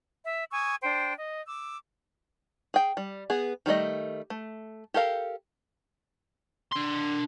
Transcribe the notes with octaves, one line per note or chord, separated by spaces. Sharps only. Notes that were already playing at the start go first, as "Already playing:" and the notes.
E5
G#5 C#6 D#6 E6
D4 C5 G5
D#5
D6 E6
G#4 G5
G3
B3 G#4
D#3 G3 A3 D#5
A3
G4 A4 A#4 F5
D4 C6